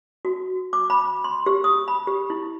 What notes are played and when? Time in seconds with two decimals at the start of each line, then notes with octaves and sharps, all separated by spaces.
0.25 F#4
0.73 D6
0.90 B5
1.24 C6
1.46 G4
1.64 D#6
1.88 B5
2.07 G4
2.30 E4